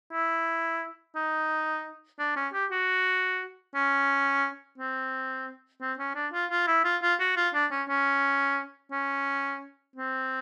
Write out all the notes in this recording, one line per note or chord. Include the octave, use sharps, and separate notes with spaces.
E4
D#4
D4
C#4
G4
F#4
C#4
C4
C4
C#4
D4
F4
F4
E4
F4
F4
F#4
F4
D4
C#4
C#4
C#4
C4